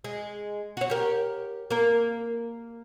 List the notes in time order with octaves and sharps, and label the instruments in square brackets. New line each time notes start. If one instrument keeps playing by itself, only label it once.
[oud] G#3
F#4 C#5
G4 A#4
A#3 A#4